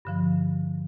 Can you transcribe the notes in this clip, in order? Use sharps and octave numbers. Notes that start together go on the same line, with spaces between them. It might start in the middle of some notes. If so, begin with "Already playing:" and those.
G2 D3 F3